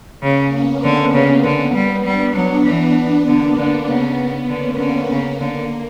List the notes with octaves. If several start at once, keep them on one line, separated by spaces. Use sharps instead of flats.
C#3 A#3 C#4
B3
D3
C#3
D3
G3
G3 B3 D4
F#3
E3 B3 D4
B3
D3 A#3
D3 A#3
C#3 B3
B3
D3 A#3 C#4
D3 B3
C#3 A#3
D3